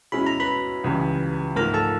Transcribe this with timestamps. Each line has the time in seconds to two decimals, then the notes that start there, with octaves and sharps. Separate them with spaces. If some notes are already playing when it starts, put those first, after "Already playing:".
0.12 B2 G#3 C#4 E4 B5
0.26 A#5
0.40 B4 B5
0.84 C#2 C#3 E3 G3
1.56 G#2 F3 A3 A#4 A#5
1.74 A4 A5